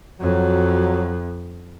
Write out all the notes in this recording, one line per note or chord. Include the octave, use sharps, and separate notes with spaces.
F2 F#3